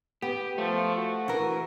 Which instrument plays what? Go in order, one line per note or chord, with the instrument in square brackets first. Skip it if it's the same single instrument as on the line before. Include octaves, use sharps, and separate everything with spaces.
[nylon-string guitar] B3 [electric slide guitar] G4
[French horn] F3 [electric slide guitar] A3
[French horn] F#4
[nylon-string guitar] E3 E4 A#4